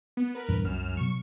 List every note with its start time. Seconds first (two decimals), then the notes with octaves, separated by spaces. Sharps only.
0.17 B3
0.35 A#4 B4
0.48 E2 G2 A#2
0.64 C2 F#2 F6 E7
0.97 B2 F#3 C#6